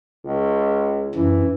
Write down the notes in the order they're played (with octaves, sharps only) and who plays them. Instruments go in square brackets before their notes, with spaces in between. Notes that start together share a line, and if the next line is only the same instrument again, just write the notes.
[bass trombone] C#2
[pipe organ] F#2 [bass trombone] E3